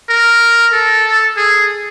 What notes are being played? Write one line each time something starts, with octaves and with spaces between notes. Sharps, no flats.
A#4
A4
G#4